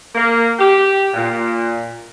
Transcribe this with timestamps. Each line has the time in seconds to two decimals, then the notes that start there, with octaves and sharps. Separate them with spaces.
0.15 A#3
0.58 G4
1.14 A#2